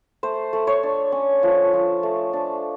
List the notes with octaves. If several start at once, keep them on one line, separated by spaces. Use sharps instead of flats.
A3 C5
A3
C#5
D4
C#4
F3
F3
A3
D4